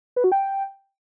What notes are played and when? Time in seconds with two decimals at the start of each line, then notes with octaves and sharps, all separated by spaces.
0.16 B4
0.24 F#4
0.32 G5